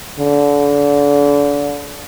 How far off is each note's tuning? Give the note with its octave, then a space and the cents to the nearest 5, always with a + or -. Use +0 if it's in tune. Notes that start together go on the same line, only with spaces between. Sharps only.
D3 -35